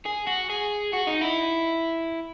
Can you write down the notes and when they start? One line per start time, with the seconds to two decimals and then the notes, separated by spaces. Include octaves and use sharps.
0.06 G#4
0.27 F#4
0.50 G#4
0.93 F#4
1.07 D#4
1.21 E4